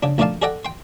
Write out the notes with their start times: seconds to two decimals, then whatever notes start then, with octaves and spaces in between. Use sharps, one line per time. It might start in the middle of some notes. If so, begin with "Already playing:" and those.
0.03 C#3 D4
0.18 A#1 A3 D#4 D5 F5 A5
0.42 G#4 A4 D5 D#5 F#5 G5
0.65 G5 C6